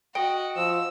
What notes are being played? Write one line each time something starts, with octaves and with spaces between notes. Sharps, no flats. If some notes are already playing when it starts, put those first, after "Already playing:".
F#4 D#5 G5
F3 E6